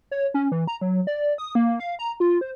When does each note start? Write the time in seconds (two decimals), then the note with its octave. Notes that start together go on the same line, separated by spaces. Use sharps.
0.11 C#5
0.34 C#4
0.52 E3
0.67 A#5
0.81 F#3
1.07 D5
1.38 D#6
1.55 A#3
1.80 F5
1.99 A#5
2.20 F4
2.41 C5